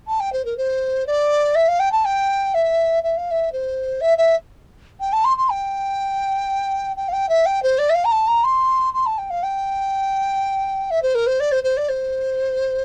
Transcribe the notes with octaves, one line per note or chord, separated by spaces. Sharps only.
A5
G5
C5
A#4
C5
D5
E5
F5
G5
A5
G5
E5
E5
F5
E5
C5
E5
E5
G5
A5
C6
C6
G5
G5
F5
G5
E5
G5
C5
D5
E5
F5
A#5
A5
A#5
C6
C6
A5
G5
F5
G5
E5
C5
A#4
C5
D5
C5
C5
D5
C5